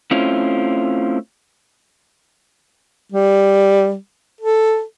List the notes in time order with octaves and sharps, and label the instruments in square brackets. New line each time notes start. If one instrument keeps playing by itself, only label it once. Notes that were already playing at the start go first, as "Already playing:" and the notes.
[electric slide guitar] A3 C4 C#4 E4 F4
[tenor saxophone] G3
A4